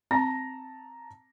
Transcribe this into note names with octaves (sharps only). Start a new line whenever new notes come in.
C4 A5 A#5 A#6